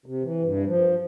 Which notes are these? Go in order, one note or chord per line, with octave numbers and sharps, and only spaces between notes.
C3
E3
G2
F3